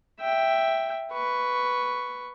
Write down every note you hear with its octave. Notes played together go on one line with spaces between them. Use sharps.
E5 G5
B4 C#6